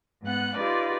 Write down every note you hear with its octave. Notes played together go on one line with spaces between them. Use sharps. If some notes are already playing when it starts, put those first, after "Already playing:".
G#2 B3 F#5 F#6
D#4 F4 G4 B4 D5